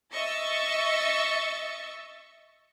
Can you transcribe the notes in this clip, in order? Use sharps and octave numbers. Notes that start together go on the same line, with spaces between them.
D#5 E5 C#6 E6 A6